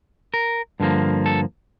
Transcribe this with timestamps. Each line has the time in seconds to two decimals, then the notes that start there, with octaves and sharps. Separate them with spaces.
0.34 A#4
0.80 G2 D3 F3 A#3
1.26 A4